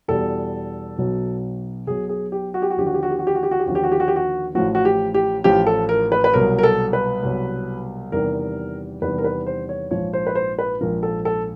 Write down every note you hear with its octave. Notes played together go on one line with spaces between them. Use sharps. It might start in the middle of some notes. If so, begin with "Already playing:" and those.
E2 B2 G3 A4
B1 B2 F#3
B1 B2 F#3 G#4
G#4
G4
F#4
G4
F#4
D#2 D3 F3 G4
F#4
G4
F#4
G4
F#4
G4
F#4
G4
F#4
G4
D#2 D3 F3 F#4
G4
F#4
G4
F#4
G4
F#4
A1 A2 F3 F#4
F#4
G4
G4
A1 A2 F3 G4
A4
A#4
B4
B4
C2 B2 F#3 A#4
A#4
A4
B4
C2 B2 F#3
E2 C3 D#3 G3 A#4
E2 C3 D#3 G3 B4
A#4
B4
C5
C#5
A#1 G#2 F3 C#5
C5
B4
C5
B4
A#1 G#2 F3 A#4
A4
A4